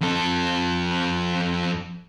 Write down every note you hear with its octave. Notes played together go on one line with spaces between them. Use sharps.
F2 A4